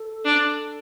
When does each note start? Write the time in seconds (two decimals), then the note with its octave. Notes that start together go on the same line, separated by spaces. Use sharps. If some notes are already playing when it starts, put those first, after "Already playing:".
Already playing: A4
0.25 D4